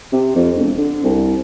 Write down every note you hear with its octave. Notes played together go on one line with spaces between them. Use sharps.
C3
F2
E1
D3
C2